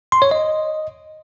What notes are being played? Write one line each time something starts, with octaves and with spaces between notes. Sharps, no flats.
C6
C#5
D#5